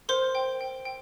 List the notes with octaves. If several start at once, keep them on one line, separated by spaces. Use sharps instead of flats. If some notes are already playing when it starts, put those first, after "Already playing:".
A#4 C5 C6
G5
G5
G5